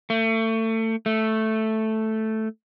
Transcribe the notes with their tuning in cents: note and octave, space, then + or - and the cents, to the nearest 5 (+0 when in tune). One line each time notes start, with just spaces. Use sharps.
A3 +30
A3 +0